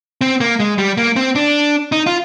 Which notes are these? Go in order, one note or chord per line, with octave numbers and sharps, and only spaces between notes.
C4
A#3
G#3
G3
A#3
C4
D4
D#4
F4